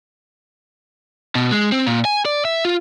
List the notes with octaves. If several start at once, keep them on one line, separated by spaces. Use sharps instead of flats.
B2
G#3
C4
A#2
G#5
D5
E5
F4